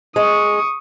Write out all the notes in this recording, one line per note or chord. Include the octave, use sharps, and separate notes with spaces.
G#3 C#6 D#6